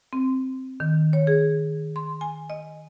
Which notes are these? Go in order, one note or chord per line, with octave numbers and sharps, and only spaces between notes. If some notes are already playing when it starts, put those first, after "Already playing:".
C4
D#3
C#5
G#4
C6
G#5
D#5